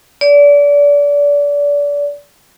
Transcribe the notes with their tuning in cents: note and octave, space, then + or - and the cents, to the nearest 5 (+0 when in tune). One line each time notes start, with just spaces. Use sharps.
D5 -30